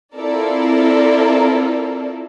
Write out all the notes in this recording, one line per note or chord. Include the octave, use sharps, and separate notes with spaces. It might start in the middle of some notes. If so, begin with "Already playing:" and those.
C4 E4 F4 A4 A#4 D5